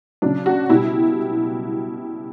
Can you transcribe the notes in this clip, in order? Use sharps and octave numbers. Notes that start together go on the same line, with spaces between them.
C#3 F#3 D4
F#4
B2 G3 E4